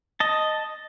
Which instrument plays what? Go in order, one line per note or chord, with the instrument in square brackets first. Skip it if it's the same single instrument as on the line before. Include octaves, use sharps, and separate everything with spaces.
[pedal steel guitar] D#5 A5